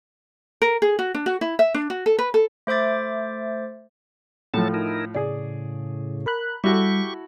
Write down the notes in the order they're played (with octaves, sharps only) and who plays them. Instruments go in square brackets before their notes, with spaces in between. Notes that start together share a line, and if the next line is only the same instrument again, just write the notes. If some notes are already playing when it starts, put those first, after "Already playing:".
[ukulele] A#4
G#4
F#4
D4
F#4
E4
E5
D4
F#4
A4
B4
A4
[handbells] A3 C5 E5 D6 A6
[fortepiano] A2 F3 [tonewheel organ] F#3 A4 A5
[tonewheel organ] D#4 E4 A#4
[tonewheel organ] A2 C#3 [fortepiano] G#4 D5
[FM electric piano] A#4 B5 F#6
[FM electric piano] G3 [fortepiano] E4 F#4 A4 [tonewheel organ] G4 C#6